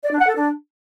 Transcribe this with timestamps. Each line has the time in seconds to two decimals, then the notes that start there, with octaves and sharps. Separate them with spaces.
0.05 D5
0.13 D4
0.21 F#5
0.29 A4
0.37 D4